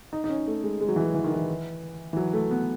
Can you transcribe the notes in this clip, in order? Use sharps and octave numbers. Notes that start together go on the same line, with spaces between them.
D#4
D#4
C#4
A3
G#3
G#3
F#3
E3
F#3
E3
D#3
E3
E3
F#3
A3
B3